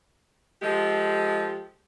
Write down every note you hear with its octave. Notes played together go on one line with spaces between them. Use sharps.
F3 G#3 G4 A4